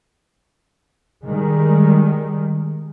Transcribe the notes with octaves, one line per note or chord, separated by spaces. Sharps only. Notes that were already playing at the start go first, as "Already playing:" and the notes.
D#3 G3 G#3